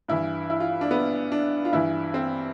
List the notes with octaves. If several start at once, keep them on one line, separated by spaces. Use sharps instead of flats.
G2 E3 E4
E4
F4
D4
B3
D4
F4
G2 E3 E4
C4